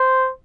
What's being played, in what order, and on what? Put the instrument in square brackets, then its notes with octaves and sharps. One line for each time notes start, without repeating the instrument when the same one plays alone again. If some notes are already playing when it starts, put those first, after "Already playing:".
Already playing: [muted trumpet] C5